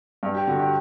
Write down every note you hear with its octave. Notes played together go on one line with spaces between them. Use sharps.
G2
G4
D3 F#4
G4